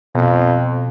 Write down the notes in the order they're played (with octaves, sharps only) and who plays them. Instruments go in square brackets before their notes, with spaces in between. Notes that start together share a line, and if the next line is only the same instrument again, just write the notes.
[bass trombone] F2 [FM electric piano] B2